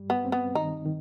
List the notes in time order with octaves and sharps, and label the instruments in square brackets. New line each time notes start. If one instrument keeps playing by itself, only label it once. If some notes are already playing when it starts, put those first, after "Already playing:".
Already playing: [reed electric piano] G2 G3
[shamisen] B3
[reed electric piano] C4
[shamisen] B3
[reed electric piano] D#3 [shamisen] D#4
[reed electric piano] D#3